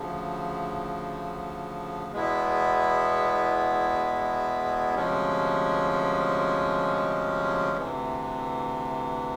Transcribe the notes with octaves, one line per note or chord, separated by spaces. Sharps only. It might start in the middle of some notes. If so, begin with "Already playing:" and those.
Already playing: D2 C#3 F3
E2 B2 G#3 B3 E4
D2 C3 F3 G#3 C#4
D2 C3 E3